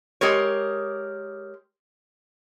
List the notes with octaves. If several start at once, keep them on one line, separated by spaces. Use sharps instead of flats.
G#3 G4 A#4 C#5